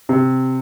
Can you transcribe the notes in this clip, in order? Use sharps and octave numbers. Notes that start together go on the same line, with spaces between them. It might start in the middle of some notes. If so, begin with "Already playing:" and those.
C3